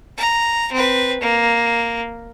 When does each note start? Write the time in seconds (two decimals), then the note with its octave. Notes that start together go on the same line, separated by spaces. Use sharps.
0.17 A#5
0.72 C4 B4
1.21 A#3